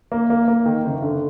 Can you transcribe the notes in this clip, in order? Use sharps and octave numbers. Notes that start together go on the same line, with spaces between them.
A#3
A#3
A#3
D#3
F#1
D3